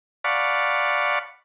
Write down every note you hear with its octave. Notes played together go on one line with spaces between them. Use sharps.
D5 F5 F#5 A5 B5 C#6